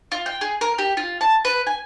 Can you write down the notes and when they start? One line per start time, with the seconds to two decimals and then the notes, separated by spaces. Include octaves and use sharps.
0.12 F4
0.26 G5
0.41 G#4
0.61 A#4
0.78 G4
0.97 F4
1.21 A5
1.45 B4
1.67 G#5